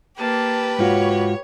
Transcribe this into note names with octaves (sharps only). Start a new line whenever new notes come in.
A#3 G4 B4 A5
G#2 F4 F#4 C#5